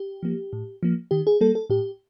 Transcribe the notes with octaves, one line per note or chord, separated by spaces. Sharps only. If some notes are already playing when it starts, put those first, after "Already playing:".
Already playing: G4
F3 A#3
A2
F3 A#3
D#3 G4
G#4
G3 A#3 A4
A4
A2 G4